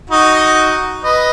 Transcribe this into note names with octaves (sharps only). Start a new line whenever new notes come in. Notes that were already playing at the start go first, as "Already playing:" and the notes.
D#4 F#4
B4 D#5